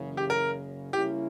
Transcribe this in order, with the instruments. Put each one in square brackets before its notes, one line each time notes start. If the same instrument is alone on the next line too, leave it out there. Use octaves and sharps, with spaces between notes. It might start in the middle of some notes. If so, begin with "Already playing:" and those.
Already playing: [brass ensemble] F#1 F#2 C#3 E3
[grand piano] G4
A#4
[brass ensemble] C#3 G3 A#3 C#4 E4 [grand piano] G4